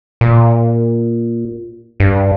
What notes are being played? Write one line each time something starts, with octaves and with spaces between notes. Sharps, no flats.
A#2
G2